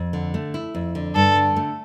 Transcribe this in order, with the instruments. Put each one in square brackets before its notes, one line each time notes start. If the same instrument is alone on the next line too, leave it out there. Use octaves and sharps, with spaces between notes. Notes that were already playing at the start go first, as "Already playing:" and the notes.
Already playing: [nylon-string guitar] F2
D3
A3
E4
F2
D3
[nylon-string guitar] G2 [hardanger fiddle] A4
[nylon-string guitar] D3
A3